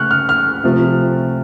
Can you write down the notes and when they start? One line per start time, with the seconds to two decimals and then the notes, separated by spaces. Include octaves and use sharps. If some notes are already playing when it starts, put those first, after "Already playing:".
Already playing: C#3 A3 C#6 F6 F#6
0.11 F6
0.29 F6
0.64 C3 F3 A3